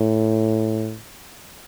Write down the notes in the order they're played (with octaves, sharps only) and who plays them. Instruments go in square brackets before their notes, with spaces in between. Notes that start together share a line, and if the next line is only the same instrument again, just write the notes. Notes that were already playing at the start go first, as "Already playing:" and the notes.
Already playing: [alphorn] A2